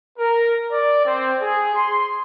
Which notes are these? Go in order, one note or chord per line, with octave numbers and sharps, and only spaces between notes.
A#4
D5
C4
G#4
C6